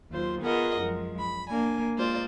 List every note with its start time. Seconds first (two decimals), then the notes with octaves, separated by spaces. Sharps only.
0.11 D#2 F#3 F4 C5
0.42 B3 F4 G#4 A#4 D#5 F#5
0.80 F#2 F3 G#3
1.19 B5
1.48 A#3 D4 G#5
1.96 G#3 A#3 F4 C5 D5